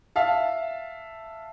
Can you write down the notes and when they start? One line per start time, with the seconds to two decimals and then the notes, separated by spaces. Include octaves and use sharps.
0.16 E5 F5 A5